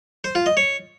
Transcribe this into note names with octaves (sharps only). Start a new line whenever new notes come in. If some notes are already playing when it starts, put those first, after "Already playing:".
C5
F4
D#5
C#5